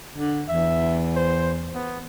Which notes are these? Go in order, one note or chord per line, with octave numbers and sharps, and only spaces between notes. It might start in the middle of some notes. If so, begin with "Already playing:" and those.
D3
E2 E5
C5
B3